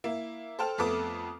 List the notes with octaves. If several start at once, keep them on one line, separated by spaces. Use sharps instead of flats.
A#3 E4
A4 C5 G5 A5 F6
F2 A3 B3 A4 D6 D#6